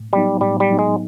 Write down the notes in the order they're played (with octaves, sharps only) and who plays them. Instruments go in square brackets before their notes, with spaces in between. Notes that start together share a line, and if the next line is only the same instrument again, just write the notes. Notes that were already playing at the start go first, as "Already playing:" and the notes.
Already playing: [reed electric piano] A2
[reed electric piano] F#3 B3 D#4 [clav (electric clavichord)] G3
[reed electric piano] A2 [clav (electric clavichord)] G3
[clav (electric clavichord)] G3
[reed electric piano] F#3 B3 D#4
[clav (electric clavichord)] G#3